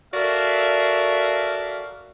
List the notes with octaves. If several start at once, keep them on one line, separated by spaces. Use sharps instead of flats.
F#4 A4 A#4 D5 E5 F5